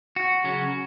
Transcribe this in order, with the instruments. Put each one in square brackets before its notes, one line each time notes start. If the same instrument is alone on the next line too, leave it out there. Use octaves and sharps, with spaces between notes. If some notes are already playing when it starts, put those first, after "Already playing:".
[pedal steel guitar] F#4
C#3 F#3 C#4